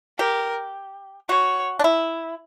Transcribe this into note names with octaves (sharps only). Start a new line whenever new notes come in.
G4 A#4
F#4 C#5
D4
E4